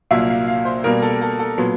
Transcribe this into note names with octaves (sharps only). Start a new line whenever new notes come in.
C2 A#2 F#3 A#3 E5
F5
F5
C5
B2 G3 A#3 A#4
A4
A4
A4
A#2 F#3 B3